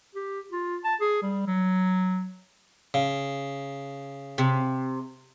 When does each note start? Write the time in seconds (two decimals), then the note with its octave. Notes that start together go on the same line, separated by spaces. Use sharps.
0.15 G4
0.52 F4
0.84 A5
1.01 G#4
1.22 G3
1.47 F#3
2.94 C#3
4.38 C3